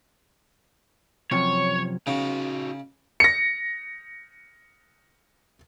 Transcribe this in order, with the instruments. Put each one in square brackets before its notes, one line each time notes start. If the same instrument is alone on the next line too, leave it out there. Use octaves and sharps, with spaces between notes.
[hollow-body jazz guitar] F#2 C3 F3 [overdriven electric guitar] C#5
[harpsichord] C#3 [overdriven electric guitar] D#4 F#4
[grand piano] A#6 C#7